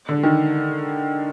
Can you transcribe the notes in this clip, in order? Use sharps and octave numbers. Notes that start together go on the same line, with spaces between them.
D3
D#3